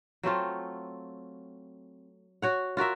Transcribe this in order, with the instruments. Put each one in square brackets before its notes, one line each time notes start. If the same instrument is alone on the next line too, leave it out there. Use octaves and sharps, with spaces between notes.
[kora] F#3 A3 C4 F4
F#4 C#5 F#5
F4 F#4 A#4 E5